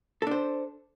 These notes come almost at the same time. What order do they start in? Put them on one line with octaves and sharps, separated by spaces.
A4 D4 C5